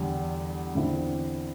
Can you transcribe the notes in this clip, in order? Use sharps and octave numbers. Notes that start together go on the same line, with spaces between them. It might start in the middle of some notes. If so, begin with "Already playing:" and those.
Already playing: E2 D3 G3
E2 D3 C4 E4